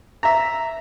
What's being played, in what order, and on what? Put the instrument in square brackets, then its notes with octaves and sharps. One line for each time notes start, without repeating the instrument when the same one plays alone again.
[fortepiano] E5 A#5